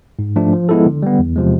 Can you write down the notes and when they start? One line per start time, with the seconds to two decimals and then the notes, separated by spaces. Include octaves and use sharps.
0.19 G#2
0.36 F3 A3 D4
0.53 F3
0.69 G#3 B3 E4 A4
0.86 D3
1.03 G3 B3
1.19 E2
1.36 C3 F3 G#3